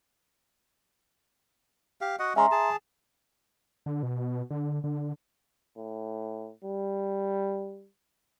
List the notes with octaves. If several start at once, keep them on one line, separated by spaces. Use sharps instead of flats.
G4 F5
F#4 D#5 F#5
G#3 C#4 E5 A#5 C6
G#4 A5
D3
B2
D3
D3
A2
G3